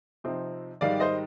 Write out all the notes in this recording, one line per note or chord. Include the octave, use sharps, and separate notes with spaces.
C3 F3 C4 D#4
G#2 D#3 G3 D5 F5
C5 D#5